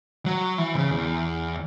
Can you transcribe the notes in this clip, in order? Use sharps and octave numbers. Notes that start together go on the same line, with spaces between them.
F#3
E3
C#3
E2